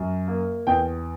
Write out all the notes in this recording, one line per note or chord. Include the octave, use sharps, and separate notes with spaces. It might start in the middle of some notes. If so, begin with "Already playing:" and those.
Already playing: F#2
A#3
E2 G5